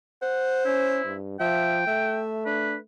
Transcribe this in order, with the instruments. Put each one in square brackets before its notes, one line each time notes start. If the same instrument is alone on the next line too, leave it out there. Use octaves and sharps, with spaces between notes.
[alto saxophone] C5 [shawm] F#5
[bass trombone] C#4 [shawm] E4
[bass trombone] G2
[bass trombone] F3 [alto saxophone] E5 [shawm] G5
[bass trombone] A3 [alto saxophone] E5
[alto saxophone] D4 [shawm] B4